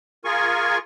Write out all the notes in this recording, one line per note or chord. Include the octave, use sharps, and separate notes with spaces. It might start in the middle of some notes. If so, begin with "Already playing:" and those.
F4 G#4 A#4 G#5 C#6